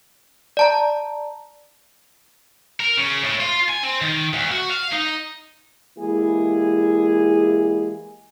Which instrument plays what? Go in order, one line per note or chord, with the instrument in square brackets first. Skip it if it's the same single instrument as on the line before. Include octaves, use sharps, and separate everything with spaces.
[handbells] D5 A5 A#5
[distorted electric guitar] A#4
C#3
A2
F4
G#5
C4
D#3
D2
F#4
F5
D#4
[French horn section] E3 G#3 A#3 E4 G4 G#4